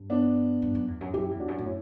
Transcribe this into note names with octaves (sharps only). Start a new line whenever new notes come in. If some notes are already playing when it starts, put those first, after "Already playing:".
Already playing: G2
B3 D4
G2
F#2
E2
F#2
F#2 E4 G4
E2
D4 F#4
F#2
A2 F#4
C#4 E4